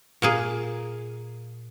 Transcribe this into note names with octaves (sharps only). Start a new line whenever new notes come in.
A#2 A#3 G#4